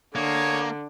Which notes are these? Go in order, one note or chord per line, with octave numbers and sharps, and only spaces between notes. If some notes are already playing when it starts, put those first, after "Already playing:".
D3 A#3 G#4 C#5